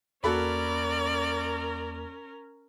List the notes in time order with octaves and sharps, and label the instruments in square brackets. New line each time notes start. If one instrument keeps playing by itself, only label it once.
[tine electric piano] E2 A#3 [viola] C#4 A#4 [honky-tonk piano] F#4 A4 B5 [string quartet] D5